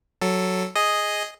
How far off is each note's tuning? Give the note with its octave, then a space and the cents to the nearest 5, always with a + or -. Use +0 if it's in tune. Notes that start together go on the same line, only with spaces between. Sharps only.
F#3 +0 A4 +0
G#4 +0 D#5 +0